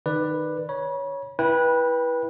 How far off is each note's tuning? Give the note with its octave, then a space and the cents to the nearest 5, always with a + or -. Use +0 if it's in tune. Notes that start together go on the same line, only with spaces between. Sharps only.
D#3 -15 B4 +0 D5 +10
C#5 +0 B5 -40
E4 +0 B4 -20 G5 +15